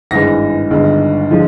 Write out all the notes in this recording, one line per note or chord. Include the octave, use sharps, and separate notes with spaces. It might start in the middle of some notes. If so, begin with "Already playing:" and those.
G#1 G2 E3 G#3 A#6
G1 G2 D#3 G#3
D3 F3 G#3